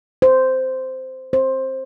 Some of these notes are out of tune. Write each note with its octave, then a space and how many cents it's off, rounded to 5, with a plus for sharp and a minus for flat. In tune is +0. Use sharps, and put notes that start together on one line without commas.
C5 -10
C5 +15